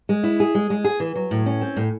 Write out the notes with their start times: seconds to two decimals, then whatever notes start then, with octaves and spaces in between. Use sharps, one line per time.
0.09 G#3
0.24 E4
0.40 G#4
0.55 G#3
0.70 G#3
0.85 G#4
1.00 E3
1.15 F#3
1.31 A2
1.46 C#4
1.61 C4
1.76 A2